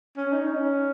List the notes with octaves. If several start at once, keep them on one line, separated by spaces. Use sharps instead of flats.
C#4
D#4
C#4